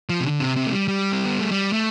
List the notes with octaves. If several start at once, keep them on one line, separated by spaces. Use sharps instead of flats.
F3
C3
D3
C3
C3
A3
G3
G3
C4
B3
A3
G3
A3